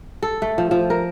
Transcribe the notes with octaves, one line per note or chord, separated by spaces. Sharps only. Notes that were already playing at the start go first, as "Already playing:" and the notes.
A4
A3
F3
F3
A#4